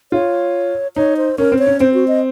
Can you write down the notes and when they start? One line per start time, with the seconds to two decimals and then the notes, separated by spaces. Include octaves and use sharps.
0.12 F4 C#5
0.96 D#4 C#5
1.17 C5
1.38 C#4 A#4
1.52 C4
1.59 C#5
1.67 C#4
1.80 C4 C5
1.94 F#4
2.08 D#5